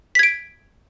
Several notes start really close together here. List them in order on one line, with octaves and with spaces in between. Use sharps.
B6 G#6 D7